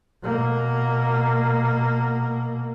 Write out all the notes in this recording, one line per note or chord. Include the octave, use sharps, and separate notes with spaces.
B2 A#3